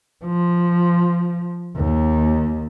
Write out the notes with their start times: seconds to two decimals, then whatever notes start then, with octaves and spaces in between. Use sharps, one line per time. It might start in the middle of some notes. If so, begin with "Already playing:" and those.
0.25 F3
1.76 D#2